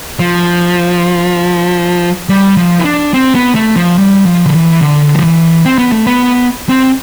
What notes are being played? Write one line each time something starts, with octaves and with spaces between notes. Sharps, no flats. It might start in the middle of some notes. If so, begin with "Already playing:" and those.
F3
G3
F3
E4
D4
C4
B3
A3
F3
G3
F3
D3
E3
D3
F3
E3
C4
B3
A3
B3
C4